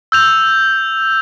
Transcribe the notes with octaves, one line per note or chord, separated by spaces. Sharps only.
E6 G6 F7